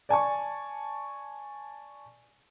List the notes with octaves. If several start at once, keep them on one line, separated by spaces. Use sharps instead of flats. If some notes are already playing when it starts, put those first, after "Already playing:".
D5 G#5 A5 C#6